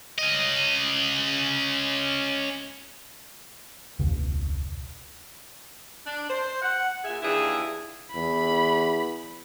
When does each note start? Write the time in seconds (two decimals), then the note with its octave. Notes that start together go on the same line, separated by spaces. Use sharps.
0.18 C#4 D#5
3.99 E1 C#2
6.06 D4
6.30 C5
6.62 F#5
7.05 A#2 G#4 E5
7.23 D#2 E3 D4 E4 G#4
8.15 E2 B5